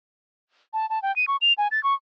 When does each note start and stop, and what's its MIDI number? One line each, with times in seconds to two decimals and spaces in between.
0.73 0.89 81
0.90 1.01 81
1.02 1.14 79
1.16 1.25 99
1.28 1.37 85
1.41 1.53 101
1.58 1.68 80
1.71 1.82 93
1.83 1.94 85